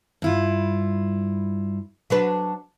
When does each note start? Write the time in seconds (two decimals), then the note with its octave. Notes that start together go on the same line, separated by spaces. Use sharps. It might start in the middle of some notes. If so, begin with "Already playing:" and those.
0.22 G2 E4 F4
2.10 F#3 D4 B4